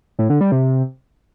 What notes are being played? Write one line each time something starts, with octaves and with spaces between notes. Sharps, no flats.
A2
D3
G3
C3